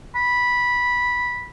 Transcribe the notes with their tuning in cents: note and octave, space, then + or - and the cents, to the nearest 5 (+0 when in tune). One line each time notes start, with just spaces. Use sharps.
B5 -10